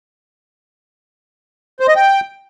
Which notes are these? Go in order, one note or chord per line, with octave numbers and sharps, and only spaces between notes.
C5
D#5
G5